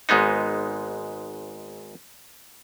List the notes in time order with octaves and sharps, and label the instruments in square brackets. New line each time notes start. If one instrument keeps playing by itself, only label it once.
[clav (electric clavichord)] G#1 G#2 G#3 B3 D#4